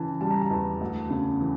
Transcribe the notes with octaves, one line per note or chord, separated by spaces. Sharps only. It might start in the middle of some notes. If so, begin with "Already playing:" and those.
Already playing: C#3 E3 A5
G3 A5
A#5
A5
E2
D2
C#3
E3